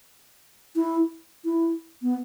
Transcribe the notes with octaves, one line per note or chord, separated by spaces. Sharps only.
E4
E4
B3